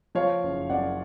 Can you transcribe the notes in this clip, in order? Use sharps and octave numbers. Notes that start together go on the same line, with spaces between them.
F3 C#5 F5
F#1
F#2 D5 F#5